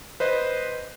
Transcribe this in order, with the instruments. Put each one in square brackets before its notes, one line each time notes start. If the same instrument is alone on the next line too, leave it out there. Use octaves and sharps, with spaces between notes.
[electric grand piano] B4 C5 D#5